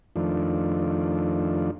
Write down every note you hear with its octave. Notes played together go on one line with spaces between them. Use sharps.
F2 D#3 F3 A3 D4